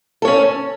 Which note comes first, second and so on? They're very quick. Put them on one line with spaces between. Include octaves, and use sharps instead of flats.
A4 C#5 C#4